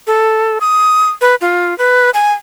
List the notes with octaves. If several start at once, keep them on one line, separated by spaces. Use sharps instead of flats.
A4
D#6
B4
F4
B4
G#5